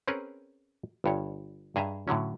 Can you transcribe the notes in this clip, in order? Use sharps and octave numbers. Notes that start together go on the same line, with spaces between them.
C4 C#4 G#4 A#4 B4 C#5
G1 G2 C#5
G2 G#4 D#5 E5 A#5
A2 D3 F#3 C#4